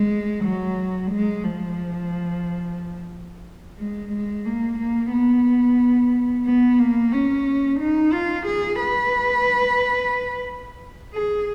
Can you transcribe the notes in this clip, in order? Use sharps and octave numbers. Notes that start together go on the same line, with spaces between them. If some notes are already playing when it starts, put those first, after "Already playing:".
Already playing: G#3
F#3
G#3
F3
G#3
G#3
A#3
A#3
B3
B3
A#3
C#4
D#4
F4
G#4
B4
G#4